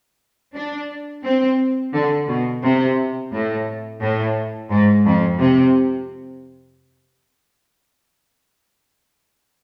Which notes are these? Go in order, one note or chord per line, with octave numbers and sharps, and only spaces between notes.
D4
C4
D3
B2
C3
A2
A2
G#2
F2
C3